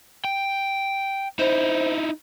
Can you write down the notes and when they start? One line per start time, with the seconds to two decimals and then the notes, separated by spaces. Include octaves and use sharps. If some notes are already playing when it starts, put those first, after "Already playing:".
0.25 G5
1.39 D#4 E4 C5